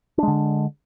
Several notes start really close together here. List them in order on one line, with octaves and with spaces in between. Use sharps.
D4 G#3 D3